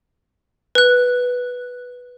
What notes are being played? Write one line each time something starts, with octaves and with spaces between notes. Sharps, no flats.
B4 F#6